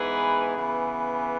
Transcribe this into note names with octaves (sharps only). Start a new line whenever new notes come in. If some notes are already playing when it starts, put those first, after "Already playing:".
Already playing: G#2 E3 B3 G#4 B4
C#3 E3 B3